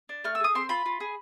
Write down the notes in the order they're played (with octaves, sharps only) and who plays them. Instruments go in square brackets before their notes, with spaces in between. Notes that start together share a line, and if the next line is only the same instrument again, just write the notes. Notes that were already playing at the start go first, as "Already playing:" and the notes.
[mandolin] D4
A3 F6
E6
G#4 D#6
C4 C6
F4 B5
F4
G#4